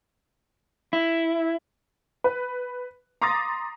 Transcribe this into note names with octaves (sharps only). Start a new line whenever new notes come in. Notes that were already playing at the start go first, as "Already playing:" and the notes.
E4
B4
A#5 C6 D6 D#6 A6 A#6